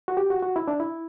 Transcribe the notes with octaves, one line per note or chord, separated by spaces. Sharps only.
F#4
G4
F#4
F#4
E4
D4
E4